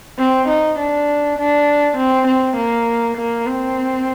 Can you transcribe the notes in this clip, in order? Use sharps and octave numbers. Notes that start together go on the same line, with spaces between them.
C4
D#4
D4
D4
C4
C4
A#3
A#3
C4